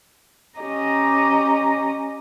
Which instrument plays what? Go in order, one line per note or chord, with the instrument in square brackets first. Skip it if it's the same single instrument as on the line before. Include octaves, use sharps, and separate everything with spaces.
[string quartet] C#4 G4 D#5 A#5